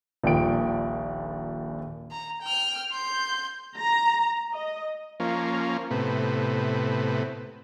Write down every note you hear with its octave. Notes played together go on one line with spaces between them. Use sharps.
D#1 A#1 A#2 G5 D7
A#5
G5 F6
C6 G6
A#5
D#5
F3 A#3 C#4
A2 C3 B3